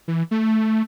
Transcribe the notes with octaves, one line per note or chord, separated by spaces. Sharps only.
E3
A3